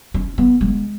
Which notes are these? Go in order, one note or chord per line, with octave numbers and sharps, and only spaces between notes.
C#4
B3
G#3